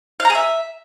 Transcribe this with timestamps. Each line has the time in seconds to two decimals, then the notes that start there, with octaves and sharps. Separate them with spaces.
0.20 F5
0.25 A#5
0.30 G#4
0.35 E5